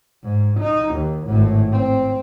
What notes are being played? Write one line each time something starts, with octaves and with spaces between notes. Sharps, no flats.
G#2
D#4
D#2
G#1 A2
C4